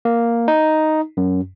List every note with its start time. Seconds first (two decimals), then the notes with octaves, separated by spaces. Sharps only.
0.05 A#3
0.48 D#4
1.17 F#2